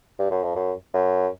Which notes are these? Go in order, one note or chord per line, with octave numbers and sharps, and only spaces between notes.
G2
F#2
F2
F#2
F#2